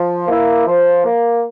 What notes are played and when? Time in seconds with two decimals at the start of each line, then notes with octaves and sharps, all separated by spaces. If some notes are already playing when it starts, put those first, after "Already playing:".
Already playing: F3
0.28 A#3 E4
0.66 F3
1.04 A#3